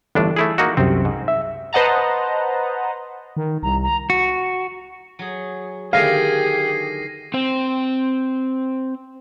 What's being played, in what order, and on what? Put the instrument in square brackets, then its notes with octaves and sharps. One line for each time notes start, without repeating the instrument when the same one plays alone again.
[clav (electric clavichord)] G1 A2 D4 [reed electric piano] E3
[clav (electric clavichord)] A3 E4 G#4
A#3 D#4 F#4
[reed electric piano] C2 F#2 C3 [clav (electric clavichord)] C4
[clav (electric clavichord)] G#2
[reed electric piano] E5
[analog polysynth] B4 C5 D#5 F#5 A5 A#5
[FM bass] D#3
[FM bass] C2 [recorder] A#5
[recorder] A#5
[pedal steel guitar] F#4
[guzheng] F#3 G#4
[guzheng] D3 D#3 [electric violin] G4 G#4 [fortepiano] F5 [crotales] A#6 C7 D#7
[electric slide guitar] C4 C5